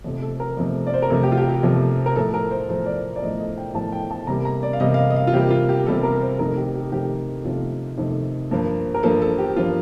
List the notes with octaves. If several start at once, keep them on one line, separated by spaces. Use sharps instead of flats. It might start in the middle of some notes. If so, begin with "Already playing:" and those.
F2 C3 F3 A3
A4
A#4
F2 C3 F3 A3
D5
C5
A#4
F2 C3 F3 A3 A4
G4
F4
G4
G4
F2 C3 F3 A3
A#4
A2 F3 A3 A4
A#4
C5
A2 F3 A3 C5
D5
D5
A2 F3 A3 D#5
D#5
G5
A2 F3 A3 A5
G5
A5
C3 G3 A#3 A#5
A#5
D5
F5
C3 G3 A#3 D#5
F5
D#5
D#5
F5
F4
C3 G3 A#3 G4
F4
G4
C3 G3 A#3 A4
A#4
C5
F2 C3 D#3 A3 A#4
G4
G4
F2 C3 D#3 A3 G4
F2 C3 D#3 A3 F4
F2 C3 D#3 A3
G2 F3 A#3
A#4
G2 F3 A#3 A4
A4
G4
G2 F3 A#3 F4